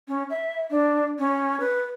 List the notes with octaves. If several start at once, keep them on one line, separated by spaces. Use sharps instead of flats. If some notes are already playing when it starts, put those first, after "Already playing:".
C#4
E5
D4
C#4
B4